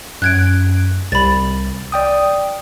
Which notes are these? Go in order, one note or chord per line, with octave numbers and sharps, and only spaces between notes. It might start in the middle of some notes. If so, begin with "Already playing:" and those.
F#2 F#6 G#6 D7
C2 B5 A6
D5 G5 D#6